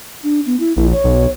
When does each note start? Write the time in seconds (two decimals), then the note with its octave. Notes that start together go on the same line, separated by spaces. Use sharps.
0.24 D4
0.46 B3
0.60 E4
0.76 A#1 E4
0.92 C#5
1.04 B1